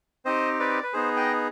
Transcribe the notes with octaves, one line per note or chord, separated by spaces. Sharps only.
C4 D#4 G4 C5 D#5
B4 D5
B4
B3 D#4 G#4 C5
D#5 G5